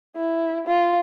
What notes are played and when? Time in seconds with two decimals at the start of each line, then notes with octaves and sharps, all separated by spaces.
0.16 E4
0.67 F4